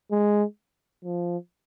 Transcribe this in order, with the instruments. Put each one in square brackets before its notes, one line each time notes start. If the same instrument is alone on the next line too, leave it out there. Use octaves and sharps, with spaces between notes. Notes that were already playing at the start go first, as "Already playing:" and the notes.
[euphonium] G#3
F3